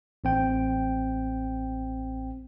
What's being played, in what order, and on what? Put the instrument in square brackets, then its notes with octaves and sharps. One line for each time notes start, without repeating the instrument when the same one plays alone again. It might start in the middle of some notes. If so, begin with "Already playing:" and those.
[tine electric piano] A1 C4 G5